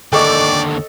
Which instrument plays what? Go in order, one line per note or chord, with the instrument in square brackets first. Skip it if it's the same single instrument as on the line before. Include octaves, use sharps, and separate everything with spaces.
[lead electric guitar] D#2 D3 [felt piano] A4 D#5 [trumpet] D5 [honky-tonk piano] G5 C#6 D6